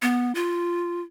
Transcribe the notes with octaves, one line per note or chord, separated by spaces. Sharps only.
B3
F4